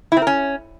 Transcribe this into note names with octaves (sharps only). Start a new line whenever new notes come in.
E4
C4
A#4
C#4